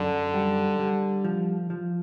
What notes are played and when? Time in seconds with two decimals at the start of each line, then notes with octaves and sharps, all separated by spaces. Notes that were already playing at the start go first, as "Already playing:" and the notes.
Already playing: F#2 D3
0.34 G3
0.79 G3
1.24 F3
1.70 F3